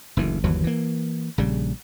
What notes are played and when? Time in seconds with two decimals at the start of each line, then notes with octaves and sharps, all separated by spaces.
0.17 F#1 D2 E3
0.44 G1 D#2 E3 F#3
0.64 E3 A#3
1.38 A#1 C#3 G3